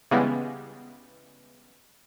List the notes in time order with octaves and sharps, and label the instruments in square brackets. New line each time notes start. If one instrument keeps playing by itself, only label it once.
[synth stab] C#3 E3 G3 G#3 B3